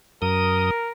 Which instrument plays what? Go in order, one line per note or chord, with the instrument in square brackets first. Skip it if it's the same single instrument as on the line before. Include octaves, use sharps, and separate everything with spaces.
[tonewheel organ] F#2 D#6 [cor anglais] A#4